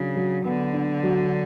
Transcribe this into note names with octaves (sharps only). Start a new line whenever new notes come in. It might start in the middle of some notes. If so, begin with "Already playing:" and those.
Already playing: C#3 F#3 D4
F#3
D3 B3
D4
F#3